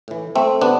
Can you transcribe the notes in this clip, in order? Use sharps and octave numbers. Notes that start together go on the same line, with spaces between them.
A2 E3
A3 C4
C3 B3 D4